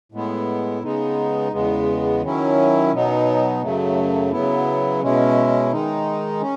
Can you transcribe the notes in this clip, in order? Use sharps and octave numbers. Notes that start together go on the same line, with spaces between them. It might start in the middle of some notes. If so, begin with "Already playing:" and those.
A2 G#3 B3 E4
C#3 G#3 B3 D#4
E2 C#3 G#3 B3
D#3 F#3 C#4 E4
B2 F#3 B3 D#4
F#2 C#3 F#3 A3
C#3 F#3 B3 E4
B2 G#3 C#4 E4
D#3 G#3 D#4
C#4